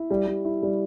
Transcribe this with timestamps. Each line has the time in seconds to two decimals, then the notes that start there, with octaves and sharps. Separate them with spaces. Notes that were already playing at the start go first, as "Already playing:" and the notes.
Already playing: E4
0.10 G3
0.27 G3
0.45 E4
0.62 G3